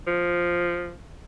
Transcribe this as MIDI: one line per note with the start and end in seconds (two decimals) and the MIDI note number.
0.07 0.95 53